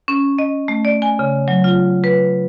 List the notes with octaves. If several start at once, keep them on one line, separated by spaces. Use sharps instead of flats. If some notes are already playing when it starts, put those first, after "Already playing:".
C#4
D#5
A3
D5
G#5
C#3
F#3
F4
B4